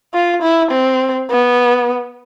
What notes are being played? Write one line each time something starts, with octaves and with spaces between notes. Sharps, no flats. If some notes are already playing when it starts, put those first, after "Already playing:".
F4
E4
C4
B3